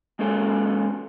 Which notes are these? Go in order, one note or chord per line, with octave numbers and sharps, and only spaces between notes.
G#3 A#3 C#4 F4 A4 G#5